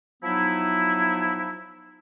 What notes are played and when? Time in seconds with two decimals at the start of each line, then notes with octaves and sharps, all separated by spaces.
0.23 F3 F#3 B3 D#4 E4